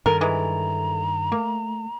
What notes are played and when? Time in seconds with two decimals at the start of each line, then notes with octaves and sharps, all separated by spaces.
0.06 G2 D#3 A4 A#4
0.21 E3 G#3 A#5
1.32 A3 A#3